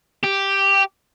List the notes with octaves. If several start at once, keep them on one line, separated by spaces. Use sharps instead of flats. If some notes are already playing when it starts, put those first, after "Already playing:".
G4